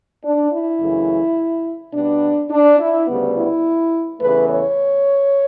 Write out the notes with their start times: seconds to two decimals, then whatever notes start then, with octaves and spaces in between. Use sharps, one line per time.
0.23 D4
0.51 E4
0.80 F#2 C#3 E3 A3
1.93 B2 G3 B3 D4
2.50 D4
2.79 E4
3.07 D2 C#3 G3 B3
3.35 E4
4.20 E2 C#3 E3 A3 B4
4.49 C#5